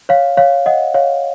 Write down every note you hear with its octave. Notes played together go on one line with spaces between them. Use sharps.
C#5 F5
C#5 F5
D#5 F#5
C#5 F5